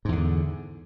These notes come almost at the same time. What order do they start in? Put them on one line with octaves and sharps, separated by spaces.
G#2 E2 D3